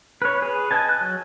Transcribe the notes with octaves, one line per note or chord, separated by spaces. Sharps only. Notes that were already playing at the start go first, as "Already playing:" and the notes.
B4 C#5
G#4 B4
D#5 G#5 A5
F#6
F#3